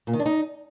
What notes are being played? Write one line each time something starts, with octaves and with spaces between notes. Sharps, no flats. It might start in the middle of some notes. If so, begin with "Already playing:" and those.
A#2
D#3
D4
D#4